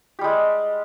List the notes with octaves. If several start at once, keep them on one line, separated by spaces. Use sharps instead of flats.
G3 G#3 G4